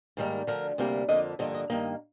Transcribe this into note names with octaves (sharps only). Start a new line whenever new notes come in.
G#2 D#3 G3 A#3
D2 D3 F3 A#4
D2 C3 G3 A#3
F2 D3 F3 A#3 D#5
G2 D3 F3 A#3 D#5
D#5
G2 D#3 A#3 D#5